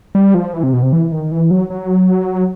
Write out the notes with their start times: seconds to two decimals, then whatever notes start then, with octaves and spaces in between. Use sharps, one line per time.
0.15 G3
0.34 F3
0.54 E3
0.63 C3
0.73 B2
0.83 C3
0.93 E3
1.12 D#3
1.32 E3
1.51 F#3
1.70 F#3